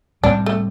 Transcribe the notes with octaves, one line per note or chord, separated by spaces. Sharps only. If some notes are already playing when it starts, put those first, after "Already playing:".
A2 G3 C4 D4
A3